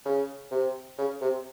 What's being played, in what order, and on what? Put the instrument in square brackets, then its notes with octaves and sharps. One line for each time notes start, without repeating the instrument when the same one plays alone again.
[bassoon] C#3
C3
C#3
C3